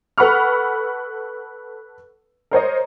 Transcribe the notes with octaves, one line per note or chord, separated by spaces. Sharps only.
A4 B4 F#5 B5 C#6 F6
A#4 C5 C#5 D#5